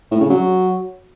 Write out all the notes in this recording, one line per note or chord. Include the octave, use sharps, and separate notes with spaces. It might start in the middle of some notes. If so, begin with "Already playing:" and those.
A2
C#3
F#3